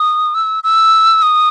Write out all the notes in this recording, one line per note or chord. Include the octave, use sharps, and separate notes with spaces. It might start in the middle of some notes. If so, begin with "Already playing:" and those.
Already playing: D#6
E6
E6
D#6